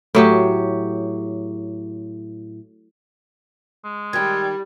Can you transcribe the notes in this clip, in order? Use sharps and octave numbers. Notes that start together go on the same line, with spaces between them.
A2 F#3 G4
G#3
D#3 G3 G4 G#6